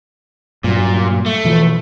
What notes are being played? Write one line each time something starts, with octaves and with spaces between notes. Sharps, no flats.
G2 A#2 F#3
A3
B2 E3 F3